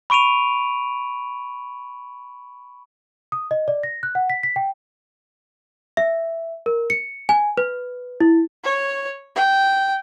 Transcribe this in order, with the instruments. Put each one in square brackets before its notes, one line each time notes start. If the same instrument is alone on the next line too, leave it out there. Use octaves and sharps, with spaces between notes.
[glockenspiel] B5 C#6 D7 D#7 F7
[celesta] D#6
D#5
D5
A#6
F#6
F#5
B6
B6
G5
E5
A#4
C#7
G#5
B4
E4
[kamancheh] C#5
G5